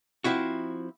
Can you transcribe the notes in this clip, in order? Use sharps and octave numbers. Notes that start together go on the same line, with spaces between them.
F3 C4 E4 F#4